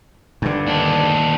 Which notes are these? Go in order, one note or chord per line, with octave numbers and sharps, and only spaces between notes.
G2 D3
D#2 D4